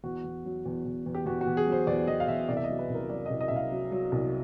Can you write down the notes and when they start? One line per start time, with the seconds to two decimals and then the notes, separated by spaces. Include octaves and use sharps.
0.04 E2 F#4
0.24 E2
0.45 F#3
0.66 E2
0.85 E2
1.06 E2
1.15 G4
1.26 E2 F#4
1.41 F#4
1.47 E2
1.57 G#4
1.67 F#3
1.72 C5
1.87 E2 D5
2.08 E2 D#5
2.20 F5
2.28 E2 E5
2.49 C2 D5
2.57 E5
2.64 D#5
2.69 F#3
2.79 B4
2.90 C2
2.95 A#4
3.10 F#3 D5
3.26 C2 D#5
3.41 D#5
3.48 E5
3.51 C2
3.56 F5
3.71 F#3
3.92 F#3
4.12 C2